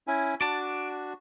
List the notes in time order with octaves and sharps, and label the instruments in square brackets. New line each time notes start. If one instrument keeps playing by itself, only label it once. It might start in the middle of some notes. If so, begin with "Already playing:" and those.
[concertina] C#4 E4 G#5
[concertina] D4 F#4 [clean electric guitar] D5 A5